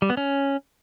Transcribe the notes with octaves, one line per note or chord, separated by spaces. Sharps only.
G3
B3
C#4